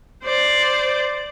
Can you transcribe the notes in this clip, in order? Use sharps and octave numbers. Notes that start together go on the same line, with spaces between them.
C5 D5